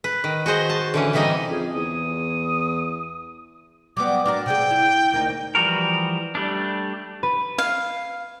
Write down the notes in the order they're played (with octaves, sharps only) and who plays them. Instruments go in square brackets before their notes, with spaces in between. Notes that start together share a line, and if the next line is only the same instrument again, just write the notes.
[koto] B4
D#3
F#4 G#4 C5 D#5
A5
D3 E3 C#4
C3 E3 G3 D#4 D#5
[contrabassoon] F2 [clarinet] G#4
[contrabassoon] E2 [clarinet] D#6
[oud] F#3 G3 B3 [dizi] D6
[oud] D4 F#4 A#4 [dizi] D6
[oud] C3 G#4 [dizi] G5
[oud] E4
D2 A#3 D#4
[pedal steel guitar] E3 F3 G3 F#4 A#4
G3 A3 D4
[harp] B4
[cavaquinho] F5